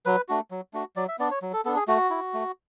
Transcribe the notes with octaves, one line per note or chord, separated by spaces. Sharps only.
F#3 B4
A3 D4 F#4
F#3
A3 D4 F#4
F#3 D5
E5
B3 D4 D5
C#5
F#3
A4
B3 D4 A4
G#4
A3 F#4
E4
A3